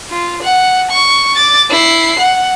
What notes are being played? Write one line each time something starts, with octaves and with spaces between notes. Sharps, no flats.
F4
F#5
C#6
D6 A6
E4 C7
F#5